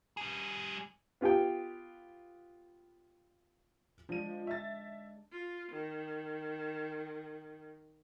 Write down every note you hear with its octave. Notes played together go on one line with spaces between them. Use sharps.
G3 G#4
B3 F4 G4 G#4 G5
F3 G#3 D4 D#7
E5 A6
F4
D#3